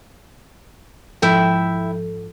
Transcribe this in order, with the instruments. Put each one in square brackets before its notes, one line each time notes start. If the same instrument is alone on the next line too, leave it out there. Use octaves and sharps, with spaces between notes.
[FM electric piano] G#2 F3 A4 [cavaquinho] E4 E5 G5